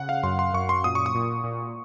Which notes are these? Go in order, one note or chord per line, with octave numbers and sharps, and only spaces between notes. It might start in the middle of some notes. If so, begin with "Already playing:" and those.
Already playing: C#3 F#5
F5
F#2 C6
C6
F#2 C#6
C6
A#2 D#6
C#6
D#6
A#2
A#2